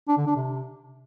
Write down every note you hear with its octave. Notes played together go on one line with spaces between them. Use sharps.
D4
D3
D4
C3